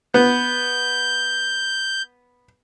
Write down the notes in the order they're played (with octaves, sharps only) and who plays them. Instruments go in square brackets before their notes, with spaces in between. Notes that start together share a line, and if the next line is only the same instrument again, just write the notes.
[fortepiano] B3 [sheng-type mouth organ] G6